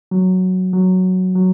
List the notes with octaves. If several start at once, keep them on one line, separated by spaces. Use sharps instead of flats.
F#3
F#3
F#3